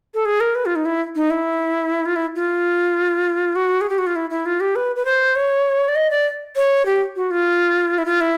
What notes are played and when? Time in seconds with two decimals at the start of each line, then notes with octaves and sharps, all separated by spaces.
0.14 A4
0.25 G#4
0.40 A#4
0.55 B4
0.66 F4
0.76 D#4
0.85 E4
1.16 D#4
1.30 E4
2.06 F4
2.16 E4
2.35 F4
3.55 F#4
3.81 G#4
3.89 G4
3.98 F#4
4.07 F4
4.16 E4
4.30 E4
4.46 F4
4.60 G4
4.76 B4
4.96 B4
5.05 C5
5.36 C#5
5.88 D5
5.95 D#5
6.10 D5
6.56 C#5
6.86 G4
7.16 F#4
7.31 F4
7.98 E4
8.06 F4
8.21 E4